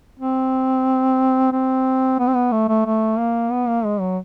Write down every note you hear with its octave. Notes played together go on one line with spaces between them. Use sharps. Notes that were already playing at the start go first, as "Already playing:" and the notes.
C4
C4
B3
C4
B3
A3
A3
A3
A#3
B3
A#3
G#3
F#3